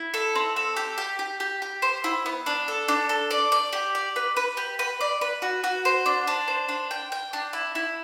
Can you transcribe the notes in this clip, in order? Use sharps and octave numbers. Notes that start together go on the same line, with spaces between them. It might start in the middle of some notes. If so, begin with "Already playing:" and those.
Already playing: E4
A4
C4
A4
G4
G4
G4
G4
G4
C5
E4
B3
D4
A4
D4
A4
D5
D5
G4
D5
B4
B4
G4
B4
D5
B4
F#4
F#4
C5
D4
D4
C5
D4
G5
G5
D4
E4
E4